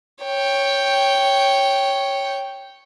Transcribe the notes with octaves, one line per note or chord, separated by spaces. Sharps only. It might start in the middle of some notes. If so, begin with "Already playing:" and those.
C#5 G5